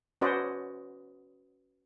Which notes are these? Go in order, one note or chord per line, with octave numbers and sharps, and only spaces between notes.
C#4 F#4 B4 C5 D5 D#5